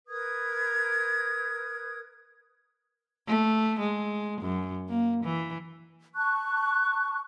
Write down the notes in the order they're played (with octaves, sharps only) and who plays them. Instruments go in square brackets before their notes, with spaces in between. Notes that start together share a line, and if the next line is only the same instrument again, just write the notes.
[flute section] A#4 B4 D#6 G#6
[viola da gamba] A3
G#3
F#2
A#3
E3
[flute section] A5 C#6 F#6